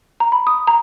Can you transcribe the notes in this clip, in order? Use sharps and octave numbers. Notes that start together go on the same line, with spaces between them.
A#5
B5
D#6
A#5